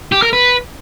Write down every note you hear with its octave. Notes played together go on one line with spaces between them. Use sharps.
G4
A#4
B4